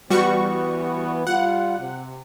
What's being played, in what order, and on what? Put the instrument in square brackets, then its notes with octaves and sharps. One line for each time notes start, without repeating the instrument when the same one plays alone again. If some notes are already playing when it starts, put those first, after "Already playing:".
[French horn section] E3 B3 [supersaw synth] G3 F#4 C#6
[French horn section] G3 F4 [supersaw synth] F#5
[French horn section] C3